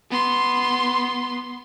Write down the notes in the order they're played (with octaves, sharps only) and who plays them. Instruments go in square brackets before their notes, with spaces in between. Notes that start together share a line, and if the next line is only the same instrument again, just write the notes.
[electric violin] B3 C6